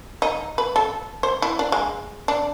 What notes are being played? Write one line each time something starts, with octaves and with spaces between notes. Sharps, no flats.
D#4
B4
A4
C5
E4
D4
G#3
D4